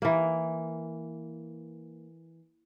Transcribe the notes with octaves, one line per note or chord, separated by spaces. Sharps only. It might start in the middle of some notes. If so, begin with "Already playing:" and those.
E3 A#3